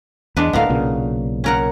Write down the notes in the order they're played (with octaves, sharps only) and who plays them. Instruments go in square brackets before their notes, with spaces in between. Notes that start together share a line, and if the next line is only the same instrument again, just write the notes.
[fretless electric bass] E2 [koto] G#3 D4 B4
[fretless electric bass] D1 A2 A3 [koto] B3 A#4 F5
[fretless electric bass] B1 A#2 C#3
[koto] C#4 A#4 F#5